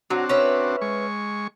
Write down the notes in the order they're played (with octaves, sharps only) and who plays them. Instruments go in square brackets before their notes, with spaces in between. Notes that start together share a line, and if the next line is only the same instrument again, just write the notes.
[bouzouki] F#3 [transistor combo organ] C4 D4 F#4
[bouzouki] C#4 B4 E5
[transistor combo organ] G#3 C#6